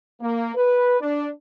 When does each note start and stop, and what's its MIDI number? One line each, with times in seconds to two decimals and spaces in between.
0.21 0.55 58
0.55 0.97 71
1.01 1.29 62